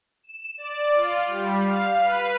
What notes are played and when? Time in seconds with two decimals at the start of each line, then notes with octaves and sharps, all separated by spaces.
0.23 E7
0.57 D5
0.94 F4
1.27 G3
1.61 F5
1.98 B4